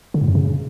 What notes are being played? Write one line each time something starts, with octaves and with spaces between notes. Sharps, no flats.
D3
G#2
F#2
C#3